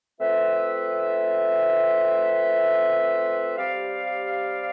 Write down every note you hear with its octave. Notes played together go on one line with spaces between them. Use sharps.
A3 C4 F4 B4 E5
G3 C4 G4 D5 F5